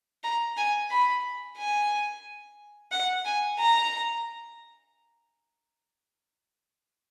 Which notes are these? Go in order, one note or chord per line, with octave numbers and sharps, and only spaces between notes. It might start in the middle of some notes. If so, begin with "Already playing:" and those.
A#5
G#5
B5
G#5
F#5
G#5
A#5